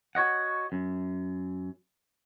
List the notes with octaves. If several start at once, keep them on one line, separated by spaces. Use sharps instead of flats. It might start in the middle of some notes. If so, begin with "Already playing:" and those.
F#4 C#5 D#5 F#5
F#2